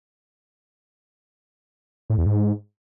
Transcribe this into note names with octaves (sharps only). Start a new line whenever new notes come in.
A2
E2
G#2